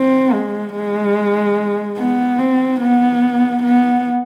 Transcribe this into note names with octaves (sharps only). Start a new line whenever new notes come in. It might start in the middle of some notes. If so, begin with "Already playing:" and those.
Already playing: C4
G#3
G#3
B3
C4
B3
B3